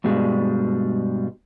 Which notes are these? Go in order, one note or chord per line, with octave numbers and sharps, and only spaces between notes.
G2 B2 G3 G#3